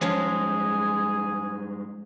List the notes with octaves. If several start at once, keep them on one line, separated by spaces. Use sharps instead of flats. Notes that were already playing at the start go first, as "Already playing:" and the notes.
G2 F3 G#3 C#4 F4 G#4